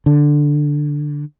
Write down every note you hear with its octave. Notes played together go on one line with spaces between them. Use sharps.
D3